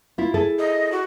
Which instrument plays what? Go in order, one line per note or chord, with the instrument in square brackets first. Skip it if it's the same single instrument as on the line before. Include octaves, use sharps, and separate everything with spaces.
[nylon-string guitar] E4 F4
E4 G#4 A4
[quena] D#5
F#4